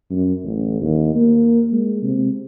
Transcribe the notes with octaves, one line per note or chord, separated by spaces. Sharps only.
F#2
A1
D#2
A#3
G#3
C3